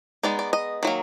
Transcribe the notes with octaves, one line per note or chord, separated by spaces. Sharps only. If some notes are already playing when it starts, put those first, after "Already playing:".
G#3 B3 D#4 D5
D5
D#5
D#3 F#3 A#3